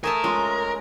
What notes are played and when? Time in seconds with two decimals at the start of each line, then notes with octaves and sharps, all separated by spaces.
0.04 A3 G#4 A#4 E5 A5
0.24 G#3 C#4 F4